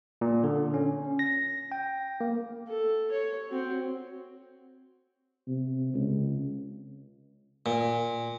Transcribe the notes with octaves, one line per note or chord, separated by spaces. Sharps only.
A#2
D3
C#4
A#6
G5
A#3
A4
C#5
C4 F#4
C3
C#2
A#2